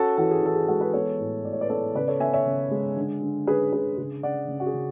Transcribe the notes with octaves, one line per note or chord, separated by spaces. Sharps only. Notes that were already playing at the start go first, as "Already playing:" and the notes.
Already playing: C#4 F#4 A4
E3 F#4 A4
G#4
E3 A4
G#4
G#3 F#4 A4
G#4 B4
B3 A4 C#5
A2
A2 D5
C#5
B4 D5
B3 A4 C#5
C#3 B4 D5
A4 C#5
B3 E5 G#5
C#5 E5
C#3
G#3
D3
D3
C#4 G#4 B4
D3 G#4 B4
C#3 G#4
C#3 D5 F#5
C#3
F#4
G#4
C#3